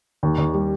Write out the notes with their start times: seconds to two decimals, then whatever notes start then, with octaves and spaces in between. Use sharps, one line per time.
0.23 D#2
0.38 D#2
0.54 G3